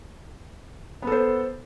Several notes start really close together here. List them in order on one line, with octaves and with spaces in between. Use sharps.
B3 A4 C5